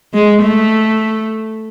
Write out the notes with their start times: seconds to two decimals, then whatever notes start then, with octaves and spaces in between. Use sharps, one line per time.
0.14 G#3
0.42 A3